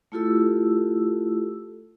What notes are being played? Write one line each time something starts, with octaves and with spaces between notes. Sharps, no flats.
A3 E4 F4 G4 A4 E6